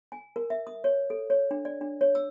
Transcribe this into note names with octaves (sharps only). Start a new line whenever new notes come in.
G#5
A#4
E5
D#6
C#5
A4
C#5
D4
D5
D4
C#5
E6